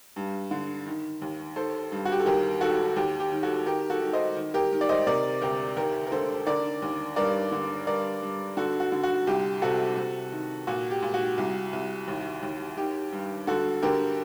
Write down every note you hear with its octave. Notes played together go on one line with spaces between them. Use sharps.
G2
D3
D#3
D#2
D#3 A4 C5
G2
F#4
G4
A4
D#2 G4 A#4
D#3 F#4 A4
D#2 G4
G4
D#3
F#4 A4
D#3 G4 A#4
F#4 A4
D#3
C5 D#5
D#3
G4 A#4
D#3
D5
C5 D#5
C3 A#4 D5
D2 G4 A#4
D#2 G4 A#4
A#4
D3 A4 C5
D3 A#4 D5
D#2
G2 A#4 D5
D3
G2 A#4 D5
G2
D3 F#4 A4
F#4
D3
F#4
C2 G4
C3 F#4 A4
C3
D#3
A#2 F#4
G4
A#2
F#4
C2
C2
D#2
D#2
D#3 G4
G2
D3 F#4 A4
D3 G4 A#4